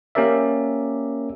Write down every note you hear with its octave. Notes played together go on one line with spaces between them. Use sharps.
A#3 C#4 G4 A#4 D5 E5